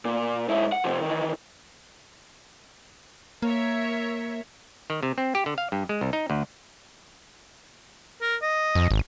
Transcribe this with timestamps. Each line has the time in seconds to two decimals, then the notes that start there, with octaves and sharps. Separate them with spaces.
0.05 A#2
0.49 G#2 E4
0.72 F#5
0.84 C3 F3
1.02 D#3 E3
3.42 A#3 A#4 C#5 E5
4.90 D#3
5.03 C3
5.18 C4
5.35 G4
5.46 D3
5.58 F5
5.72 G2
5.89 G#3
6.01 C2
6.13 D#4
6.30 D2
8.22 A#4
8.42 D#5
8.75 F2
8.91 G#1